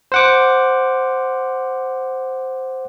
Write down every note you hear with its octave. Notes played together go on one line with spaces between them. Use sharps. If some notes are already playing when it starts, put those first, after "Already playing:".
C5 F#5 D6